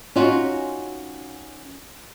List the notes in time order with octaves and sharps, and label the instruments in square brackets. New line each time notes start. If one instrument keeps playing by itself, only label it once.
[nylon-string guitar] C#4 D#4 F4 F#4